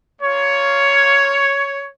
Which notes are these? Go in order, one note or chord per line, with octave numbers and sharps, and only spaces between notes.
A#3 F4 C#5